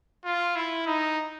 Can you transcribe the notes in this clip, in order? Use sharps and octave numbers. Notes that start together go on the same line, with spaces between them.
F4
E4
D#4